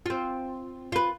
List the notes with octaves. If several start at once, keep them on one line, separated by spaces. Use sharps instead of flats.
C4 F4
F4 B4